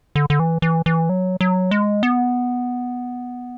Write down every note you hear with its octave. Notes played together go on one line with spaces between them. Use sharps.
D3
D3
E3
E3
E3
F#3
F#3
G#3
B3